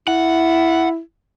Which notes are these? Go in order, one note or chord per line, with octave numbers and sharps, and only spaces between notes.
E4 F#5